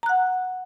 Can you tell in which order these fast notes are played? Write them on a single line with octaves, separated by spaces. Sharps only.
A#5 F#6 F#5